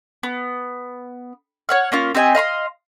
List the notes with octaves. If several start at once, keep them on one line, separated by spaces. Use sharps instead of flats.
B3
C#5 F#5 F6
A#3 C#4 F4
C4 G4 D#5 G#5
D#5 F5 B5 C6